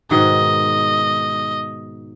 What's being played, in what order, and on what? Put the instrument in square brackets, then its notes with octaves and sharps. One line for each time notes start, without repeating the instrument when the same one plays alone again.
[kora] G#2 B2 D#3 [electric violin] D#5